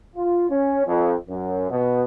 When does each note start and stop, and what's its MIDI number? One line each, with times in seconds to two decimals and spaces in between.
0.16 0.46 65
0.50 0.85 61
0.87 1.14 41
1.29 1.67 42
1.70 2.04 47